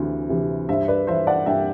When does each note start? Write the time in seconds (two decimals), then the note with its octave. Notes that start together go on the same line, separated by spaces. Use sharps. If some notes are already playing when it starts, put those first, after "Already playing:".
Already playing: D2 C3 E3
0.29 C3 E3
0.69 G2 C5 E5
0.88 B4 D5
1.07 E3 C5 E5
1.27 D5 F#5
1.46 G2 E5 G5